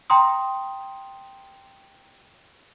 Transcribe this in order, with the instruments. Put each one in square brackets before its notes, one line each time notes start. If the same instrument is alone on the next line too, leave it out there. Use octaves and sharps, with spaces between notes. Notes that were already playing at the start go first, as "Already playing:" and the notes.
[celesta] G5 A#5 C6 D#6